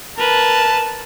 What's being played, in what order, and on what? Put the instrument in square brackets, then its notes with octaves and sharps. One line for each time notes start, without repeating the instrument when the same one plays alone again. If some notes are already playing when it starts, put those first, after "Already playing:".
[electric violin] A#4 B4 [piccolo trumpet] A5